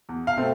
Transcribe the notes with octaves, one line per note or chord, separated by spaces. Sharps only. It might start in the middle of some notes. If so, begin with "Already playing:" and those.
E2
F5
B2 A3 C4